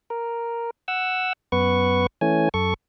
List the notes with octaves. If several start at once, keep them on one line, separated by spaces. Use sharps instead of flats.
A#4
F#5 E6
F#2 B3 B4 C#6
E3 A3 C#4 G#5
F#2 A4 C#6